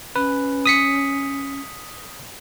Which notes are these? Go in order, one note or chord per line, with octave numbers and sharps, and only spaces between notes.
C#4 B4
D#6 B6 C#7